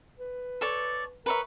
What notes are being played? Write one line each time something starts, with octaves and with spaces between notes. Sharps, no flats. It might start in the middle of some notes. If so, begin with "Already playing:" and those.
B4
A4 C#5 D5
A#4 B4 C#5 E5